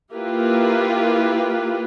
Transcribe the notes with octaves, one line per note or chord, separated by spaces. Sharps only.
A#3 E4 F4 G4 A#4 B4